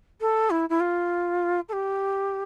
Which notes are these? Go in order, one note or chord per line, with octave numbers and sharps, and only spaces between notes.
A4
E4
E4
F4
A4
G4